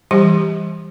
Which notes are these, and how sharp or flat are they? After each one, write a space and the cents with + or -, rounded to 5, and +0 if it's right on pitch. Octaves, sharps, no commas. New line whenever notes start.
E3 +0 G3 +10 G4 +10